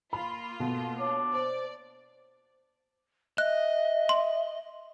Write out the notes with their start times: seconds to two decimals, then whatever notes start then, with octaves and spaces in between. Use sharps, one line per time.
0.13 A#3 F4 B5
0.60 B2 A4
0.99 D4 C#5
1.33 C5 D5
3.38 D#5 E5 F#6
4.09 C6